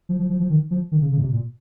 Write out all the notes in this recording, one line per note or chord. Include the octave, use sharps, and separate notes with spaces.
F3
F3
F3
F3
D#3
F3
D#3
C#3
C#3
A#2
C3
A#2